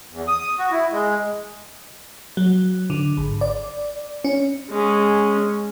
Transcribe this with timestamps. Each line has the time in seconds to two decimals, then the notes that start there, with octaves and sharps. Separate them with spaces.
0.11 E2
0.28 D#6
0.59 F#4
0.72 E4
0.91 G#3
2.37 F#3
2.90 D3
3.17 G#1
3.41 D5
4.25 C#4
4.70 G#3 C#4